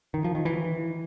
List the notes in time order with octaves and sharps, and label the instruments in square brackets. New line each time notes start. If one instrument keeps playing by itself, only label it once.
[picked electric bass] D#3
F3
D#3
E3